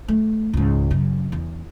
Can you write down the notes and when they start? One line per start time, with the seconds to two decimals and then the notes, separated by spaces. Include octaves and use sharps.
0.08 A3
0.53 C#2 G#2
0.91 F#2 C#3
1.32 E2